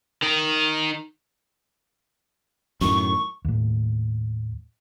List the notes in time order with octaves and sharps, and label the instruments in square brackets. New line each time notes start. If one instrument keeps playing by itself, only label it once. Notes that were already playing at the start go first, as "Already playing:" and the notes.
[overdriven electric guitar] D#3 D#4
[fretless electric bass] F#2 A2 D#3 [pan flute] C#6
[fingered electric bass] D#2 A2